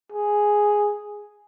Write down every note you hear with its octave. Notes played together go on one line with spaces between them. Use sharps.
G#4